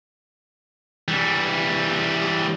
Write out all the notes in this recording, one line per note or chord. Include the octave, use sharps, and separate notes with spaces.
E3 G3